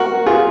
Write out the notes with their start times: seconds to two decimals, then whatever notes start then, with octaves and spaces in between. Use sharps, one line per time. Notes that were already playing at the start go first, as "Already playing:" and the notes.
Already playing: F#4 A#4
0.26 F4 G#4